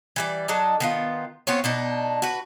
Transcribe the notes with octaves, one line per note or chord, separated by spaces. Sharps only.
E3 G3 D5
F#3 D4 A4 D#5
D#3 B3 F4
B3 C4 F4 C#5
B2 D4 D#4
F#4 B4